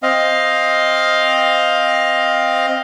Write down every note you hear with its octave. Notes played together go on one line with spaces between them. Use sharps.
C4 D#5 F5